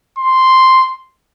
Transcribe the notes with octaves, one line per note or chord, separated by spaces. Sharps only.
C6